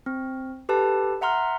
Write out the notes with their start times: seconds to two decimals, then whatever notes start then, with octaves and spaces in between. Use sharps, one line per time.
0.06 C4
0.69 G4 A4 B4 A5
1.21 E5 F#5 A#5 C6 F6